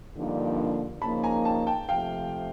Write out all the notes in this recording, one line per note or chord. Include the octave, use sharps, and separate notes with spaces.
G2 D3 F3 A#3 D#4
C#3 F3 A#3 D#4 A5 B5
G#5 A#5
G5 A5
G5 A5
C3 F3 A3 F5 G5